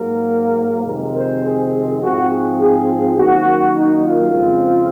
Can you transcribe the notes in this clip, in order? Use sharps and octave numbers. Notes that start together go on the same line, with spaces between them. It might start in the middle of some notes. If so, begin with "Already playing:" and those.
Already playing: G#2 F#3 A#3 A#4
F2 C3 D#3 G#3 C4 A#4
C5
G#4
G#2 F3 C4 F#4
G#4
G#4
F#2 D#3 A#3 F#4
D#4
F4
F2 C#3 G#3 C4